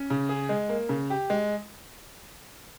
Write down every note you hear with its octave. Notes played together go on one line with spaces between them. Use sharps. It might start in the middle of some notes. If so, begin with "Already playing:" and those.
Already playing: C#4
C#3
G#4
G#3
A#3
C#3
G4
G#3